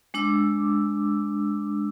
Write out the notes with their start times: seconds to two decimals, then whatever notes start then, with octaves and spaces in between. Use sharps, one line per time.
0.14 G#3 D4 D6 E6